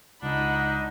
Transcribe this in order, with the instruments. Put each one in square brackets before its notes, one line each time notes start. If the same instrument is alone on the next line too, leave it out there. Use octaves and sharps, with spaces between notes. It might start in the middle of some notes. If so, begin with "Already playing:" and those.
[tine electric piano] C#2 [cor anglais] D4 [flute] D#4 [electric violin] F#5 B5